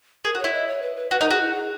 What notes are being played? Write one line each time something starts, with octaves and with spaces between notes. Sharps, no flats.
G#4 A#4
F#4
E4 C#5
D#5
C#5
B4
B4
F#4 B4
D#4 A#4
F#4 G#4
E4
G#4